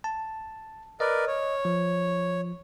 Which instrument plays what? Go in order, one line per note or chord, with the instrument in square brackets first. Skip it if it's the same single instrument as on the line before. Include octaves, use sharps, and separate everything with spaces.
[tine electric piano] A5
[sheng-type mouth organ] A#4 B4 D5 [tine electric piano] D#5
[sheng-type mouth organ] C#5
[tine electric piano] F3